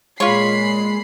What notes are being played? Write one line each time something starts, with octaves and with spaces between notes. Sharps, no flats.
A#2 G#3 F4 C#5 B5 C7